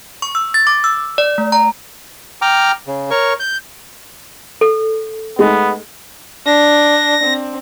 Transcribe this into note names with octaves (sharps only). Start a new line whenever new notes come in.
C#6
E6
A6
D6
E6
D5
A3
A#5
G5 A#5 D6 F6
C#3
A#4 C#5 C#6
G6
A4
G#3 A3 B3 D#4
D4 A#6
C4